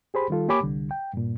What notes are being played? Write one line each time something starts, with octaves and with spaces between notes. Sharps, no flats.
G4 G#4 C5 B5
D#3 G3 F4 A4
A#3 G4 C#5 G#5 B5 D6
C2 D3 G3
G5
G2 A#2